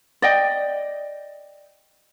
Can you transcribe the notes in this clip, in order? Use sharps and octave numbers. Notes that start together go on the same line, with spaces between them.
D5 D#5 G5